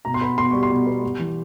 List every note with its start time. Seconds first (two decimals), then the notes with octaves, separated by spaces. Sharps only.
0.05 B2 A#5
0.14 C6
0.21 B3 B5
0.37 B2 C6
0.51 G3 C#6
0.63 C6
0.70 B2
0.87 B3
1.03 G3
1.19 E3